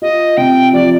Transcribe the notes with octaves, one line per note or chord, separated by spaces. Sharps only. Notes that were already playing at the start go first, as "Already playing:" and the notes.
F4 D#5
C3 G5
F3 D5